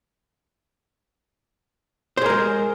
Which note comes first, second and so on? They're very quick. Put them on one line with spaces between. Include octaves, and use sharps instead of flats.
C5 G#4 A#4 G#3